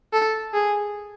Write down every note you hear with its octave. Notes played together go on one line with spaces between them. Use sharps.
A4
G#4